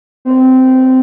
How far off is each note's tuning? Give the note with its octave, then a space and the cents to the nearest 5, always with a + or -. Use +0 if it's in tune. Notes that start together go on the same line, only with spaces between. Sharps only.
C4 -15